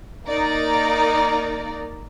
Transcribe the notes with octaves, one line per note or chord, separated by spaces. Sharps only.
A#3 D#4 D5 A#5